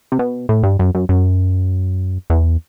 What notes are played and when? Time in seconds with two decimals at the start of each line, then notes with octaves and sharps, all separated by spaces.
0.12 C3
0.19 B2
0.49 A2
0.63 G2
0.79 F#2
0.95 F#2
1.09 F#2
2.30 E2